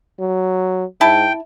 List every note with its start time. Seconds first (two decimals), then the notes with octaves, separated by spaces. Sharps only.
0.20 F#3
1.01 G#2 E4 G5 A5